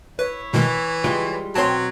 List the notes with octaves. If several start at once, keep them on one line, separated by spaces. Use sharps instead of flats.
E4 B4 C#5
B2 D#3 E3 G#3
C#3 G3 G#3 F4
B1 F#3 C4 C5 C#5 G5 A5 C6